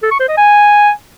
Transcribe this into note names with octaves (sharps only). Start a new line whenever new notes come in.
A4
C#6
C5
D#5
G#5